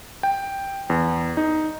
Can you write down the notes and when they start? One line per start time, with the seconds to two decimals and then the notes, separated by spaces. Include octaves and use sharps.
0.23 G5
0.90 E2
1.37 D#4